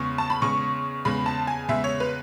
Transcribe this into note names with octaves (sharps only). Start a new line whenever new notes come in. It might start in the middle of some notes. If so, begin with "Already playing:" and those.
Already playing: E2 C#3 G#3 C#6
A5
B5
E2 C#3 G#3 C#6
E2 C#3 G#3 B5
A5
G#5
E2 C#3 G#3 E5
C#5
B4